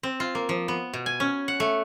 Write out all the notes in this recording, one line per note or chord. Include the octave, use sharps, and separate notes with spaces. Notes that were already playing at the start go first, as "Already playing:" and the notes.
C4
F4
A#3
F3
B3
B2
G#5
C#4
F#5
A3